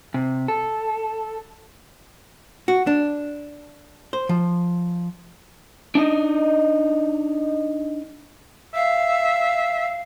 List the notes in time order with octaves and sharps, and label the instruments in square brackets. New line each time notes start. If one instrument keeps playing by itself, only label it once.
[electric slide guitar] C3
A4
[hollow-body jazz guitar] F#4
D4
C5
F3
[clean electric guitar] D4 D#4 D#5
[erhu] E5 [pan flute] F5